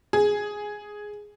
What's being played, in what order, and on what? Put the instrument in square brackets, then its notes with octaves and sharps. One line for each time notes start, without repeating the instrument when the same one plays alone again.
[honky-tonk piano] G#4